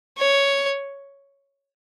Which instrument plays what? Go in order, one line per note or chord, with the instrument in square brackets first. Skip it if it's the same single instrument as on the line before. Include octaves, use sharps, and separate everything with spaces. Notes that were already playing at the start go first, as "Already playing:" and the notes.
[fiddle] C#5